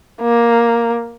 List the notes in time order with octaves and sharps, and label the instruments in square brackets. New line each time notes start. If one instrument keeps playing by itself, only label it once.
[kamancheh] A#3